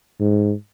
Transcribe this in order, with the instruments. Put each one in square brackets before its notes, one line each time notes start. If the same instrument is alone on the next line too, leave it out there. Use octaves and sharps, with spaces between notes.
[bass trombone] G#2